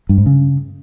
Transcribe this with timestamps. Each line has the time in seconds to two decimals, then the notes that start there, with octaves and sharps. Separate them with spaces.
0.09 G2
0.18 G#2
0.26 C#3